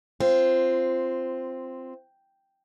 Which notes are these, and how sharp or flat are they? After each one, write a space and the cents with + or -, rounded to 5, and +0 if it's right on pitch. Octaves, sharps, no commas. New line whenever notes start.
C4 +0 F4 -15